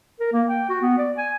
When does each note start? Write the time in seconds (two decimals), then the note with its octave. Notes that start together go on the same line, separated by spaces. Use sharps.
0.20 A#4
0.33 A#3
0.48 G5
0.69 F#4
0.81 B3
0.98 D5
1.18 G#5